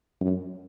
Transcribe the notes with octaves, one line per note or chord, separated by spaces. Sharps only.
F#2